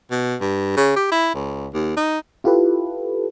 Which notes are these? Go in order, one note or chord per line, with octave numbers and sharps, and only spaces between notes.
B2
G2
C#3
G4
E4
C#2
D#2
D#4
E4 F4 G4 A4 B4